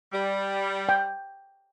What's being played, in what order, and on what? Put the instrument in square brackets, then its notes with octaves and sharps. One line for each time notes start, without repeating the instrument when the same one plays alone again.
[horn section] G3
[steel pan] G5